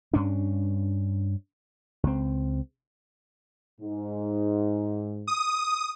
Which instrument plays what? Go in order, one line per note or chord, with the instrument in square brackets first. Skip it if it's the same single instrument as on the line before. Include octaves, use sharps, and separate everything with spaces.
[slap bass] G2 C#4 D4
C#2 C4
[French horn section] G#2
[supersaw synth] D#6